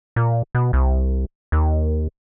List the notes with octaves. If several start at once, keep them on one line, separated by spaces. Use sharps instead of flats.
A#2
B2
C2
D#2